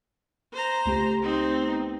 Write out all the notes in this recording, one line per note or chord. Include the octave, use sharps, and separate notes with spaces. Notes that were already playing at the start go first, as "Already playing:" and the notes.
C5 A#5
C#2 A3 G4
C4 D#4
B3